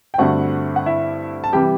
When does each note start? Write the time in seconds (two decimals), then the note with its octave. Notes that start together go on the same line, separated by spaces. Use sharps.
0.14 G5
0.18 G2 D3 A3 C4 F#4 F#5
0.76 F#5
0.86 E4 E5
1.44 A5
1.53 C3 E3 G3 G4 G5